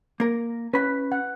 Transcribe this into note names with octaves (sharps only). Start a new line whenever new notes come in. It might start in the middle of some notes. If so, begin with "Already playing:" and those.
A#3 A#4
C#4 B4 B5
F#5